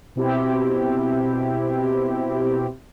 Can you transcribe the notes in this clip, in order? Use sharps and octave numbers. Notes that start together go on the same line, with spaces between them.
B2 C4 E4 G4